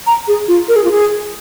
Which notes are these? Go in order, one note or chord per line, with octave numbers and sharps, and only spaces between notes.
A#5
G#4
F4
A#4
G#4
F4
G#4